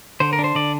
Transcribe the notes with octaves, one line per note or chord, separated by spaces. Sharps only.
D3 C5
A#4
D4
C5
D3 D5